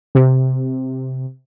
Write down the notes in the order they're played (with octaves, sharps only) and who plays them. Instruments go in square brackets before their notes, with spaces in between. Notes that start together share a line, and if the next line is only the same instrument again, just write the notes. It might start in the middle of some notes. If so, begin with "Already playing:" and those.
[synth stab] C3